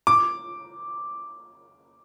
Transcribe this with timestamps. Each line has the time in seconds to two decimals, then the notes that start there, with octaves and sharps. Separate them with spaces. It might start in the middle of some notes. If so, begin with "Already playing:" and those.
0.07 D6